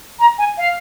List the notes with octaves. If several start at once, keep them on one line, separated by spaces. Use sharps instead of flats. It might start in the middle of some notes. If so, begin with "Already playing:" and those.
A#5
G#5
F5